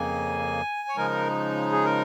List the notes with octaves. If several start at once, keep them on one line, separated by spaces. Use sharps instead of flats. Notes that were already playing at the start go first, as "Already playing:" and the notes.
Already playing: F2 C#3 A#3 G#5
C#5
C#3 F3 G#3 D#4 A#4
G#4
A#4